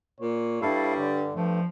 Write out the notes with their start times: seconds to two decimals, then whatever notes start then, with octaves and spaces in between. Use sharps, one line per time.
0.20 A#2 C#5
0.62 G2 G3 E4 A4 F5
0.98 D3
1.35 G2 F3 A3 E5